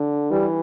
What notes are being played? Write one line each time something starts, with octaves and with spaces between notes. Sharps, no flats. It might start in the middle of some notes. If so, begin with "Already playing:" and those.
Already playing: D3
E3 G3